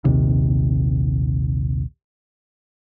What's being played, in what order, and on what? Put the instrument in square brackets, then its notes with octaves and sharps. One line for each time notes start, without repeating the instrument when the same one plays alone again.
[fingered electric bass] A#1 D#2 C3